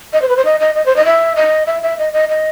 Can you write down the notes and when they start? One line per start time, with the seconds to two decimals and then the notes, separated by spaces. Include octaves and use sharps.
0.13 D#5
0.22 C5
0.29 B4
0.37 C5
0.45 D#5
0.60 D#5
0.75 D#5
0.86 C5
0.96 D#5
1.05 E5
1.36 D#5
1.67 E5
1.83 E5
1.99 D#5
2.13 D#5
2.29 D#5